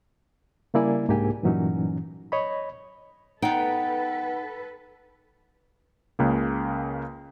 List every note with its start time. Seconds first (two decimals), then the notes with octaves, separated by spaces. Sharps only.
0.74 C#3 G3 A#3 E4 D5 G#5
1.08 C2 G#2 A#3 D4 G4 G#5
1.43 G2 A#2 E3 F#3 C#4 D#4
2.32 C#5 D#5 B5
3.42 B3 D#4 A4 B4 F#5 G5
6.19 C#2 C#3 A#3